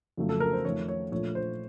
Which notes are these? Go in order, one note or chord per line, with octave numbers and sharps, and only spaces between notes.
F2 C#3 F#3 A3
A4
A#4
C5
F2 D#3 A3 C#5
C#5
A#1 A#2 F3 A3 C#5
C5